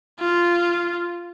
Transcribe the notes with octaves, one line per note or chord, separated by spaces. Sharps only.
F4